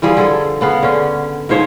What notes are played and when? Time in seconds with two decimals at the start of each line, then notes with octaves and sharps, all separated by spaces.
0.02 E3 F3 G3 G#4
0.17 D3 G#4 A4
0.61 C#3 B3 F5
0.83 D3 C#4
1.49 G#2 F3 C5 C#5